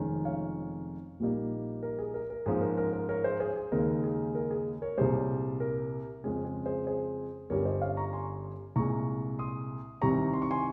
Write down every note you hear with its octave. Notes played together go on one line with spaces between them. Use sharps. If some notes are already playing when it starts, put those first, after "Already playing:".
Already playing: F1 F2 D#3 G#3 C#4
C#5 F5
A#1 A#2 G3 A#3 D#4
A#4
G#4
A#4
A#4
G#2 F3 A#3 C#4 G#4
A#4
A#4
A#4
A#4 C#5
G#4 C5
G#4 C5
G#4
D#2 C#3 G#3 D#4 A#4
G#4
A#4
G#4
A#4 C#5
C2 A#2 G3 G#4 C5
A#4
F2 C#3 G#3 C#4 G#4
G#4
G#4 C5
G#4 C5
G1 G2 G3 C#4 A#4 C#5
C5 D#5
C#5 F5
A#5 C#6
G#5 C6
C2 A#2 G#3 A#5 C#6
C6 D#6
C2 C3 D#3 G3 C4 A#5 C#6
C6
C#6
G#5 C6